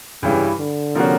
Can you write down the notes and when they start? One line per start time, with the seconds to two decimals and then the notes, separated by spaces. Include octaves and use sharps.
0.23 G2 C#3 E3 G3
0.59 D3
0.95 C3 F3 A#3 C#4 F#4